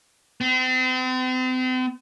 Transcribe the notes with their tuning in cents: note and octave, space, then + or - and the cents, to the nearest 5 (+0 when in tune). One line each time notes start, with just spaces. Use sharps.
C4 -40